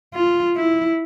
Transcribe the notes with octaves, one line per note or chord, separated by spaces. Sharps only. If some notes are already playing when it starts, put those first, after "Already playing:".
F4
E4